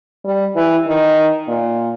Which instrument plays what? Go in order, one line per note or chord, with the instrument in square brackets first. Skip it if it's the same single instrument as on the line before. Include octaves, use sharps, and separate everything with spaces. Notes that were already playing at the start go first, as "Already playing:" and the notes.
[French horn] G3
E3
D#3
A#2